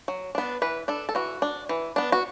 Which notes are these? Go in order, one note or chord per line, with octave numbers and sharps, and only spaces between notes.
F#3
B3 D4
E3 B4
D4 A4
A4
E3 F#4
D4
E3
B3 D4
F#4